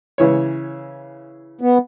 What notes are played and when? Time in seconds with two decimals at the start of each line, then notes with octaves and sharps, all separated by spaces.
0.18 C#3 E3 C#5
1.61 B3